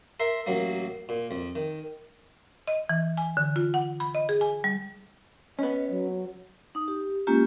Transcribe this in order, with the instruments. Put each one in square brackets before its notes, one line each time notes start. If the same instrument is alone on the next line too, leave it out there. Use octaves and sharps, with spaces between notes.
[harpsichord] A#4 E5 C6
A1 F#3 A#3
A#2
F2
D#3
[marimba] D#5
E3
G#5
D3
F4
F#5
B5
D#5
G#4
G#5
G3
[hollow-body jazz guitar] B3 C#4 [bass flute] D#5
[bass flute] F#3
[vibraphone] D#4 D#6
G4
G#3 A#3 C#4 F4 G4